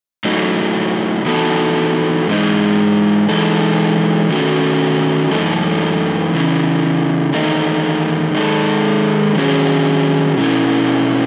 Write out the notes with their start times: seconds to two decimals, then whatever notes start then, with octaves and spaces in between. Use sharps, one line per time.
0.25 A2 F#3 A3 D#4
1.25 E3 B3 D#4 F#4 A4
2.27 G#2 E3 G#3 D#4
3.29 E3 G#3 D#4 A4
4.29 D#3 A3 C#4 F#4 A4
5.31 F#2 E3 A3 D#4 A4
6.32 E2 C#3 E3
7.33 E2 D#3 A3 D#4
8.34 D#3 G#3 D#4 A4
9.35 D#3 F#3 C#4 G#4
10.36 B2 A3 C#4 E4